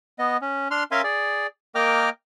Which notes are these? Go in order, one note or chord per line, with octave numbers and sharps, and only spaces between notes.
B3 D#5
C#4
D4 C6 F6
C#4 A#4 E5 F5 G#5 C6
G#4 D5
A#3 A#4 D#5 G5 D6 F6